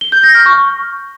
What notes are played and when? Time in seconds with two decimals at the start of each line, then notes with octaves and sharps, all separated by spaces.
0.01 G7
0.12 G6
0.23 A#6
0.35 F6
0.46 C#6